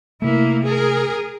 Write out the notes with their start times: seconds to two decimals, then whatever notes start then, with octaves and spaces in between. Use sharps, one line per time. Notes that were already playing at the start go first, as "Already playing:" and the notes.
0.22 C3 A3 A#3 E4
0.63 G#4 A#4